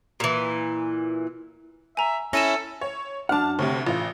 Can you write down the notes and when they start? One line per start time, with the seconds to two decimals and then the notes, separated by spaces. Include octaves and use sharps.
0.20 A#2 E3
1.97 E5 G#5 A#5
2.33 C#4 E4 A4 A#6 D#7 E7
2.81 C#5
3.29 F#2 D4 F#5 A5 F6
3.59 D2 C3 C#5
3.86 A1 F4 F5